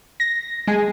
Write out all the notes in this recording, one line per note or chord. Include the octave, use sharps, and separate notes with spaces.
A#6
G#3 G#5